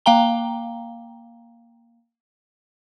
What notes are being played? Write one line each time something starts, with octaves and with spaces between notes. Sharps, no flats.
A#3 F5 G5 A#5 G7